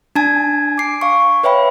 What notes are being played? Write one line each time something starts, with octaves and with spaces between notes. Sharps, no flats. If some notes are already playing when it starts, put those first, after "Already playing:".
D4 G#5 A5 G#6
D6 C7 D7
F5 C#6
B4 C#5 E5 G5 B5